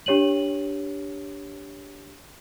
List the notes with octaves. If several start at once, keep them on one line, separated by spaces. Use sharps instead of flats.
D4 G4 C#5 D#7 F#7